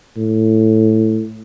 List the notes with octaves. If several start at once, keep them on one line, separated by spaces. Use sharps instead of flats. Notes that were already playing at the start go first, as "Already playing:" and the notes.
A2